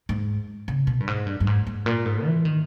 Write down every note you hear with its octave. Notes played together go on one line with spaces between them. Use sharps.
G#2
C#3
B2
G2
G#2
G2
G2
G#2
G#2
A#2
G#2
E3
D#3